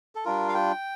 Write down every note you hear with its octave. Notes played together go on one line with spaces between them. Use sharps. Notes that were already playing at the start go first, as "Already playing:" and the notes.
A4
G3 D4 F4 A#4
F5
G5